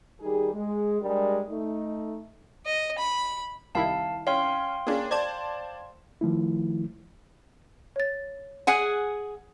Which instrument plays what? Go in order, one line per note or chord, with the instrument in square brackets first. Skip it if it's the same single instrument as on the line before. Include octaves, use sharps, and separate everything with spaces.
[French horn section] D#3 G3 D#4 G4 G#4
G#3
G3 G#3 D4 G4 A#4 D5
A3 D#4
[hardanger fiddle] D#5
B5
[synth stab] C2 D#3 E4 [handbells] F5 A5
[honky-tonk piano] C#4 [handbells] F5 G5 C6
[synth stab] A#3 C#4 [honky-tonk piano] D4 G#4
[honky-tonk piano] C5 D5 A5 [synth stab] G#6
[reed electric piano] D#3 F3 A3 E4
[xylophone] C#5 A6
[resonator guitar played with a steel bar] G#4 F#5 G#5